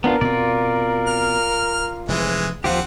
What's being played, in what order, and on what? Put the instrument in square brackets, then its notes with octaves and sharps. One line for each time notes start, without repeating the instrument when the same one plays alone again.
[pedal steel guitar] B3 D4 F4 [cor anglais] A#4
[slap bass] B2 C4 [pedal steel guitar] F4 D5
[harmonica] F6
[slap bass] F1 [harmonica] E3 G#3
[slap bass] D#2 [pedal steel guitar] F3 F4 G4 [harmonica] C4 F#5